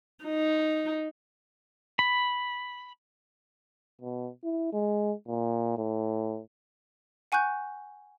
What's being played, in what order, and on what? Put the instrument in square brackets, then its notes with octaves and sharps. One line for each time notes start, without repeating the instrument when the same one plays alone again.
[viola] D#4
[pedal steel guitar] B5
[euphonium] B2
E4
G#3
A#2
A2
[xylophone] F#5 G#5 C#6 F#6 G6